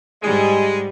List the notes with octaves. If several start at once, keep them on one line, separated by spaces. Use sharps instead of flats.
G#2 G3 G#3